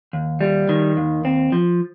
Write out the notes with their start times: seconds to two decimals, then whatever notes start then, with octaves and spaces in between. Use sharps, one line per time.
0.13 D#2
0.41 G3
0.69 D#3
0.97 D#2
1.25 C4
1.52 F3